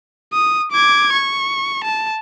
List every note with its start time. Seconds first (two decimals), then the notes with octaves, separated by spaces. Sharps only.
0.33 D#6
0.72 D6 G#6
1.12 C#6
1.84 A5